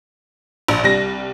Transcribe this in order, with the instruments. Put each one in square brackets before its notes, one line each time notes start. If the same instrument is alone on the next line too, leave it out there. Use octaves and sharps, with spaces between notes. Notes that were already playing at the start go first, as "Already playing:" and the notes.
[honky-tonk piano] A#1
C2 G3 A#6